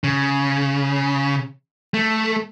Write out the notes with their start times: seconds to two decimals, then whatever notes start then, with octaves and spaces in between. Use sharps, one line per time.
0.04 C#3
1.94 A3